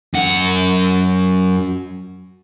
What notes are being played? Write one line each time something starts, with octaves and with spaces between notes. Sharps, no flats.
F#2 F#5